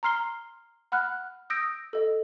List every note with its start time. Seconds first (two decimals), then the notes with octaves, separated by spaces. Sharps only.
0.03 A#5 C6 F6 C7 G7
0.92 F#5 B5 F6 F#6
1.50 D#6 E6 G6 A#6 D7
1.93 A4 D#5